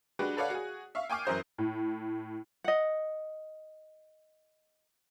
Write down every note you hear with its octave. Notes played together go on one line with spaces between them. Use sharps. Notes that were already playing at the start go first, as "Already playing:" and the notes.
G#3 D4 F#4 G4 B4
A4 B4 C#5 D5 F5 F#5
F#4 G#4
E5 F5 C#6
G5 G#5 C#6 D6 F6 C7
F#2 E3 A#4 C5 D#6 G6
A2
D#5 F#5